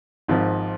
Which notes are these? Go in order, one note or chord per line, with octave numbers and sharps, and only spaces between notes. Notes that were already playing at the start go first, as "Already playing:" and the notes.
G#1 G#2 F3